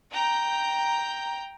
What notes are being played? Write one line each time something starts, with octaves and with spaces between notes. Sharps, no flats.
G5 A#5 G6